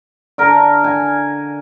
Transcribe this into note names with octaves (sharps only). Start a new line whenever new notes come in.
D3 A#4
G#5